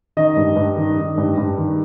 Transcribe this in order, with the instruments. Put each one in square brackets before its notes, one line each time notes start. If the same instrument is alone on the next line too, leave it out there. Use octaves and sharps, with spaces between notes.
[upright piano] D#3 D#5
G2
G2
D#3
D#3
G2
G2
D#3